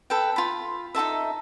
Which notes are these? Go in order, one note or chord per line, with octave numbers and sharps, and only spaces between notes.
A4 B4 G5
F4 B5
D#4 F4 A4 E5